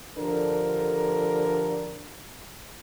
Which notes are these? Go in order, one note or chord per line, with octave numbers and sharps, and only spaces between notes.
D3 F3 D4 G4 A4 A#4